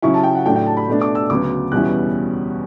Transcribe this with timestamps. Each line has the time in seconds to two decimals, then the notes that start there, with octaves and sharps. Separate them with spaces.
0.02 C#3 F#3 C#4 E4 C#6
0.14 A5
0.24 G5
0.35 F#5
0.46 A2 F#3 A3 D4 G5
0.56 G5
0.67 A5
0.77 B5
0.88 B2 A3 D4
1.02 D6
1.15 E6
1.30 D2 C#3 F#3 B3 D6
1.72 E2 B2 G3 C#4 E4 F#6